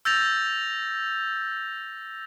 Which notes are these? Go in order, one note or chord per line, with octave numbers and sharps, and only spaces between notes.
E6 G6 A6 A#6 F7